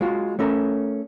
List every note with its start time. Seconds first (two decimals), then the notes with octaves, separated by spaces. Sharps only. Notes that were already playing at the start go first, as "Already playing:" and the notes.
0.01 G#3 F4 F#4
0.39 A3 C#4 A4 A#4